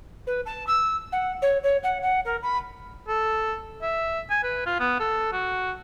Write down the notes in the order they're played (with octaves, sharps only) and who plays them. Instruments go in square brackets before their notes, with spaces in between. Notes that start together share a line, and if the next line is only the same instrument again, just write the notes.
[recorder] B4
A5
E6
F#5
C#5
C#5
F#5
F#5
A#4
B5
[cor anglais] A4
E5
G#5
B4
F4
B3
A4
F#4